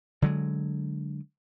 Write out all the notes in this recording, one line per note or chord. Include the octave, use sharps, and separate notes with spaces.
D3 F#3 G#3